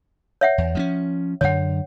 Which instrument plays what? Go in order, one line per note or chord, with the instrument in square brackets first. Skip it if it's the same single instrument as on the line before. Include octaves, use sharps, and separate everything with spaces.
[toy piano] C#5 E5 F#5
[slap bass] E2
F3 C4 C#4
[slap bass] F#2 D3 [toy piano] C#5 F#5